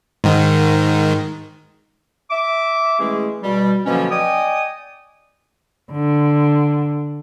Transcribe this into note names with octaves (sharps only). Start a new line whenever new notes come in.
G#2 D#3
E5 D6
E3 G#3 A3 C#4 G#4
B2 G3
B2 D3 F3 F#3 A#3 C#4
D5 D#5 G5 G#5 D#6
D3